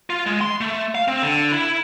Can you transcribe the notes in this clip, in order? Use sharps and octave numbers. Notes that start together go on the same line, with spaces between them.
F4
G#3
C6
A3
F5
C4
D3
E4